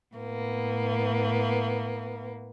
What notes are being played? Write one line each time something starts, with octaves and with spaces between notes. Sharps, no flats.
A2 A#3 B3